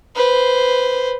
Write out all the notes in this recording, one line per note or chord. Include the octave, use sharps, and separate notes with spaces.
B4 C5